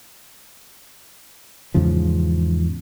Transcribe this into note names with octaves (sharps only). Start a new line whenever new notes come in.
E2 G#2 C#3 F3